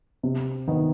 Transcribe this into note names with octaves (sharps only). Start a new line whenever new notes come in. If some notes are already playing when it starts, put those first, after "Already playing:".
C3
D#3 B3